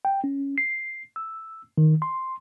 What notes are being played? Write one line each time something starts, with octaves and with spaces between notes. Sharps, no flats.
G5
C#4
C7
E6
D#3
C6